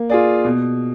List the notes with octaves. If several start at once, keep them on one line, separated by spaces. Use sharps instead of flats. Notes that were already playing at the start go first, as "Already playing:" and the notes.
Already playing: A#3
F4 G#4 D5
B2